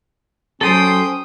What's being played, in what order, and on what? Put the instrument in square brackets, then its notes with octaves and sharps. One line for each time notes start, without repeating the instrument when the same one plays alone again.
[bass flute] F#3 [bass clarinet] C#4 [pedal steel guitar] A4 C5 C6 [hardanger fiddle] G5 D#6